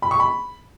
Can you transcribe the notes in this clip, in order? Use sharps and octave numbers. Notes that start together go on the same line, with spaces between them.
B5
C#6
B5